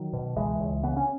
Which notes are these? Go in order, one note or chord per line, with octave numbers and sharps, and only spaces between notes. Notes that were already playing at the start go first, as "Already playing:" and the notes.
Already playing: D#3 F#3
B2
C#2 E3 G#3
C#2
C#3 B3
C#4